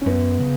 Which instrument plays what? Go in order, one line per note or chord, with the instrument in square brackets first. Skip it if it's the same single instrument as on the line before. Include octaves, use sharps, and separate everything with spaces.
[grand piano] C#4
[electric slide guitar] F#2 [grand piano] B3
[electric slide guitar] C#3